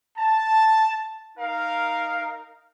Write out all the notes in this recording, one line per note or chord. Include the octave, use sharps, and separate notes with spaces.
A5
D#4 A#4 F5